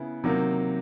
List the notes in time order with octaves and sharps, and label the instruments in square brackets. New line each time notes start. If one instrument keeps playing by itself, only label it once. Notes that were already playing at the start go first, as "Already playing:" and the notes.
Already playing: [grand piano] C#3 B3 E4
C3 D#3 F#3 A#3